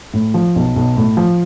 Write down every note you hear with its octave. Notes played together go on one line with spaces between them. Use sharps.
A2
F3
B1
B1
A2
F3